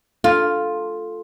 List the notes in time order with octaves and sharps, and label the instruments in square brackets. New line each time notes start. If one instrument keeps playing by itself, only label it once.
[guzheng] F4 [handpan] A4